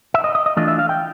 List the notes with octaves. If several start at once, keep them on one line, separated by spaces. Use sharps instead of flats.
E5
D#5
D#5
D#5
E3 A3 D4 F4 D#5
E5
F5
G5